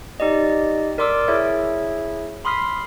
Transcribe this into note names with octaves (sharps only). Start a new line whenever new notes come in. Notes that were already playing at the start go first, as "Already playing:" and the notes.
D#4 G4 D5 D#5
A#4 D5 C6 D6 E6
E4 G#4 C#5 E5
B5 C6 D#6 F6 B6 C7